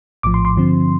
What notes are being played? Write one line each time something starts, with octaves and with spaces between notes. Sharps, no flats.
A#1 A2 F3 D6
C6
C6
G2 D3 F3 C4